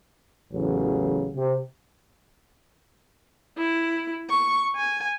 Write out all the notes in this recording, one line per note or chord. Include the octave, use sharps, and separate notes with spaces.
A1 E2 C#3 F#3
C3
E4
C#6
G#5